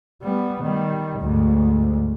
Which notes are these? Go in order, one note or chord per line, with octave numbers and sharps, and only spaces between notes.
G3 B3
D#3 G3
D2 G#2